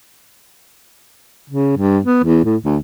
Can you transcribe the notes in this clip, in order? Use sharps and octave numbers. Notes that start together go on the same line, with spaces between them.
C#3
G2
B3
E2
A2
D2